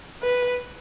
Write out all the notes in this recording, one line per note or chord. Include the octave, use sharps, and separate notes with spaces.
B4